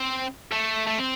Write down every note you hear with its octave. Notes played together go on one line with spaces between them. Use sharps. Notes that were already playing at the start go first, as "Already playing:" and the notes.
Already playing: C4
A3
A3
C4